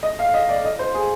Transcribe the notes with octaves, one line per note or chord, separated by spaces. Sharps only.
D#5
F5
D#5
D5
D#5
C5
G#4